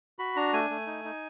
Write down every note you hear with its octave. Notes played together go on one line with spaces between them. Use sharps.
F#4 B5
D4 A#5
A3 G#5
A3
D#4
D#4